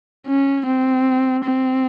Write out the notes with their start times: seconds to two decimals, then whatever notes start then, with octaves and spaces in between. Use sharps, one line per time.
0.27 C#4
0.66 C4
1.44 C4